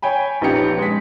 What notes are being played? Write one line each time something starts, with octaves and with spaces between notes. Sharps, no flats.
C#5 G5 G#5 B5
A#1 B3 C#4 D#4 G4 C#7
G#3 B6